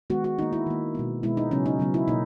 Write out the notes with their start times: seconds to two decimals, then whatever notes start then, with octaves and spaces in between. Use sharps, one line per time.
0.10 D#3 G#3 B3 F#4
0.24 F#4
0.38 D#3 A#3 D#4
0.53 E4
0.67 D#3 A#3
0.95 B2 G#3 B3
1.23 B2 G#3 B3 E4
1.37 D#4
1.51 C#3 F#3 B3 C#4
1.66 D#4
1.79 C#3 F#3 B3
1.94 E4
2.08 B2 A#3 D#4